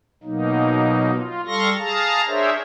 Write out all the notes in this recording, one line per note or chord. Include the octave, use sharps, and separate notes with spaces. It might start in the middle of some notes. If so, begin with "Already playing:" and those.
B2 F#3 A#3 D#4
F4
G3 A4 F5 C6 C#6 A#6
G#4 F5 A5 A#5
D4 G#4 A#4 C5 C#5 E5